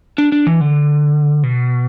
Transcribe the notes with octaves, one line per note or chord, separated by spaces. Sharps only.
D4
D4
E3
D3
B2